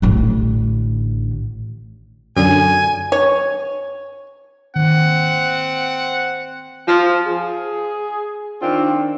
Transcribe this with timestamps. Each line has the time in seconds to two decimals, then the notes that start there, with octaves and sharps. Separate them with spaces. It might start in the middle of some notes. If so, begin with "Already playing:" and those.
0.02 A1 D3
2.37 F#2 D3 G#5
3.12 C#5
4.76 D#3 C4 F#5
6.88 F3
7.26 G#4
8.62 D#3 C4 D4 F4